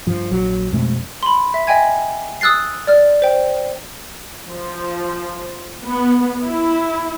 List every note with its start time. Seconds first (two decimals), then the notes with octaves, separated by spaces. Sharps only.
0.07 G2 F3
0.31 A#1 F#3
0.72 F2 B2 G#3 A3
1.23 B5 C6
1.54 E5
1.67 D#5 E5 G5 G#5 G#6
2.41 D#6 E6 F#6 A6 C7
2.87 D5 F6
3.22 C5 G5
4.48 F3
5.83 B3
6.42 E4